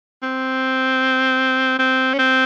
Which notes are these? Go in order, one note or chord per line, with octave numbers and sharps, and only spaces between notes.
C4
C4
C#4
C4